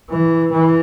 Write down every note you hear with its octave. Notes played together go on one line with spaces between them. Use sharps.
E3
E3